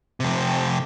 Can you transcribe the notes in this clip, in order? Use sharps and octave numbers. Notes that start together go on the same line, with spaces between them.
F2 C3